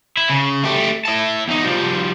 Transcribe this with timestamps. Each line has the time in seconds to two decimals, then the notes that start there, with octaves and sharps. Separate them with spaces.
0.17 E4
0.30 C#3
0.64 A3 G4
1.05 E4 A5
1.48 E2 D#4
1.65 F3 G3